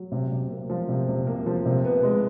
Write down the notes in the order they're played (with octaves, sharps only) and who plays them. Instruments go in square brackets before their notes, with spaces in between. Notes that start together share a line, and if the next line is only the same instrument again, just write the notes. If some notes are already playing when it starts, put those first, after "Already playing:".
Already playing: [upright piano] F#3
C3
C3
A#3
F3
C3
C3
A#3
F3
C3
B3
G#3